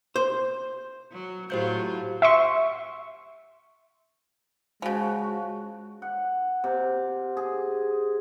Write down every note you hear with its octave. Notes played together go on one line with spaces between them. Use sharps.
C5
F#3
A2 F#3 F4 G4 C5 G6
E5 C6 C#6
C#3 F3 G#3 F#4
F#5
C3
G#4